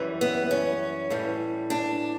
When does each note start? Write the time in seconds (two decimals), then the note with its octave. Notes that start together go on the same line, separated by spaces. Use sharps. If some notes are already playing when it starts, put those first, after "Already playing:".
Already playing: F#2 E3 G3
0.21 B3
0.51 C#4
1.10 A2 E3 G3
1.70 D4